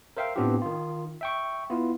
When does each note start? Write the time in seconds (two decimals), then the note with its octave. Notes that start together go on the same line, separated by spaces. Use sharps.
0.17 A#4 C5 E5 F5 G5
0.36 A2 B3 C4 D4 F4 G4
0.62 D#3 F4
1.21 E5 G5 C#6
1.70 B3 E4 F4